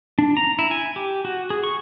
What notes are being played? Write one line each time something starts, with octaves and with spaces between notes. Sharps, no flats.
D4
A#5
E4
G#5
G4
F#4
G#4
C#6